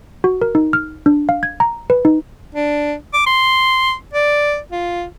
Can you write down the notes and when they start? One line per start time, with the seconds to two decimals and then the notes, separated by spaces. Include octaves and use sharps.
0.24 F#4
0.42 A#4
0.55 D#4
0.73 F6
1.06 D4
1.29 F5
1.43 G#6
1.60 A#5
1.90 B4
2.05 D#4
2.55 D4
3.14 D6
3.26 C6
4.14 D5
4.72 F4